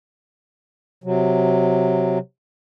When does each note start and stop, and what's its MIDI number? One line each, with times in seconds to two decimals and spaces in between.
1.04 2.18 48
1.04 2.18 54